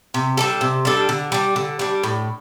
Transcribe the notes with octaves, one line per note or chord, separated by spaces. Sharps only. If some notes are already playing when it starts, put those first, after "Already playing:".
C3
G3 D4 A4
C3
G3 D4 A4
D3
G3 D4
D3
G3 D4
A2